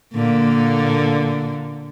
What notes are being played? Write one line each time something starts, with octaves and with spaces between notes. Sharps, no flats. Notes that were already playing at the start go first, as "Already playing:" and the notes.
A#2 D3 A#3